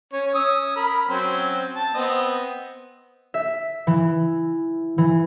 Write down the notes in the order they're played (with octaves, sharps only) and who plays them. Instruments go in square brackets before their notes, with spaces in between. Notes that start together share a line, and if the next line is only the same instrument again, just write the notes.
[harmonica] C#4 C#5
C#4 D#6 E6
A#4 B5
F#3 C4 C#4
A5
B3 C4 D#5
[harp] E5
E3
E3